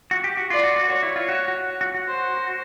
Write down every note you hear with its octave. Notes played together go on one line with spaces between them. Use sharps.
F#4
G4
F#4
F4 D5
F#4
F#4
F#4 C#5
E4
F4
F#4
F#4
F#4
F#4
C5